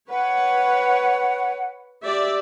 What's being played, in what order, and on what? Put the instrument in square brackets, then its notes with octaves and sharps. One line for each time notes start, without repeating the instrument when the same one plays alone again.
[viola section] B4 C#5 [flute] F#5
[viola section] G4 D5 E5